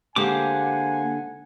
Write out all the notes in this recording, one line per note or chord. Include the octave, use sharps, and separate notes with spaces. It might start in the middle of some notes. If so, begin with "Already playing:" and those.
D3 G#3 A#3 G4 C5 F#5 G#5 D6